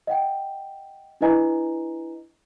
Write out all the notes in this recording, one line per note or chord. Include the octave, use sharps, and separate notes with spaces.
D#5 F#5 G5
D4 E4 B4 D#5 G#5 A#5